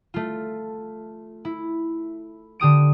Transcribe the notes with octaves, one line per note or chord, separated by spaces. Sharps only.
A3 F4
E4
D3 G4 D#6 D7